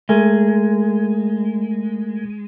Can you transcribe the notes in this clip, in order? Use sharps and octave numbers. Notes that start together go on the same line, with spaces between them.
G#3 A3 A#4 G#5